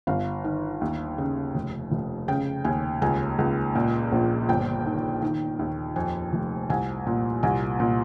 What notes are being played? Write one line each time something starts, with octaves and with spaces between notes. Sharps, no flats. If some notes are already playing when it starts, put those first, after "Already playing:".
G1 F5
D#3
D#2
C#3
F1
F1
C#3 G5
D#2 G#5
C#2 G#5
C#2
A#2
A#1
G1 G5
D#3
D#3
D#2
F2 G#5
F1
C2 G#5
A#2
C2 G#5
A#2